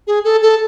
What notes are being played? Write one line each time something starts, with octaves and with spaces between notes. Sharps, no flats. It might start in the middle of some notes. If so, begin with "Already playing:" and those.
G#4
A4
A4